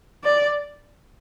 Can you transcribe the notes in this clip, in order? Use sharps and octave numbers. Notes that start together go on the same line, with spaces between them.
D5